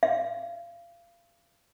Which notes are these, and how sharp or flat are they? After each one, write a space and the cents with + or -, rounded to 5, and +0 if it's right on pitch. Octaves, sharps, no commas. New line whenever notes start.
F5 -30